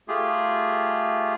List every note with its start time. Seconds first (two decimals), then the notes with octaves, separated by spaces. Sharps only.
0.08 A3 F4 G4 G#4